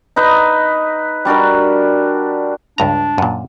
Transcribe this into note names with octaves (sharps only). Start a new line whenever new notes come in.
D#4 B4 D#5
G3 D4 F#4 A#4
C#2 G2 D4 A#5
F#2 A#2